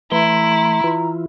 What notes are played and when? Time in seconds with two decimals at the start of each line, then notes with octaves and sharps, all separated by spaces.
0.12 E3 A3 E4 A#5 C6
0.84 E3 E4 F4